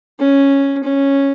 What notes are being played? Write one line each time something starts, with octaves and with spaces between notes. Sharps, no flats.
C#4
C#4